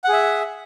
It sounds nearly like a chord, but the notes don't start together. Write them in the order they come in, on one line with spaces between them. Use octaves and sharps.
F#5 G#4 E5